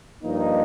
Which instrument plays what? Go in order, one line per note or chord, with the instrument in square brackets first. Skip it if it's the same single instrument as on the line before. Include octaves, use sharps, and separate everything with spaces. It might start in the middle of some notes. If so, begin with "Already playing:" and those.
[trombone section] G2 F3 A#3 D#4